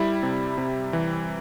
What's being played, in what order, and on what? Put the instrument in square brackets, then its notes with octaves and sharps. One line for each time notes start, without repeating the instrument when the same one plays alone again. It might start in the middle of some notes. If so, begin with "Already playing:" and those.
Already playing: [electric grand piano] G3 E4
C3
C3
E3